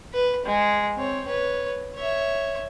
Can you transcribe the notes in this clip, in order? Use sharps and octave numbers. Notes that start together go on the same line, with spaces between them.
B4
G#3
C4 C#5
B4 C#5
C#5 E5